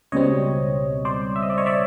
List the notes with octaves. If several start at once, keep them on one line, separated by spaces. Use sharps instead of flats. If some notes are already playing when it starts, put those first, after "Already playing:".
C#2 B2 G3 C4 C#5 D#5
C5 D5
E5
D#5
D5
C#5 D#5
D5 E5